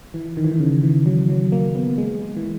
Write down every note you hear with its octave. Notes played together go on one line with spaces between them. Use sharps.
E3
D#3
E3
D#3
C#3
E3
F#3
F#3
A#3
B3
G#3
E3